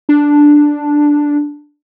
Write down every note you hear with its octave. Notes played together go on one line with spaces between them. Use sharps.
D4